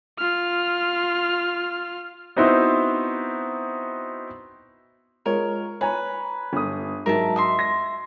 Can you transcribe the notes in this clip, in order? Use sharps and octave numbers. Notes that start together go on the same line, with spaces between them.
F4 F6
B3 C4 D#4 E4 F#4 C5
G#3 F4 A#4 C#5
B4 C#5 G#5 A#5
G1 D#6
G#2 F#3 A#4 E5 A5
D#5 E5 C6
A#6